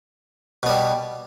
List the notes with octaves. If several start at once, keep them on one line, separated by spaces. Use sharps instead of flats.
B2 G3 B3